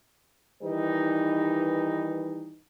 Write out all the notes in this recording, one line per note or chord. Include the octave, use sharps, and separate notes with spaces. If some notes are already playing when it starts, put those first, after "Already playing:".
D#3 E3 G3 D#4 B4